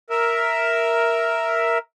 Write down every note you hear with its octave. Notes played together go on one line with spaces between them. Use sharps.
A#4 E5